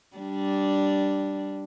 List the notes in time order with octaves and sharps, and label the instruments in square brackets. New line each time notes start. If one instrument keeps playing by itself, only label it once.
[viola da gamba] G3 D4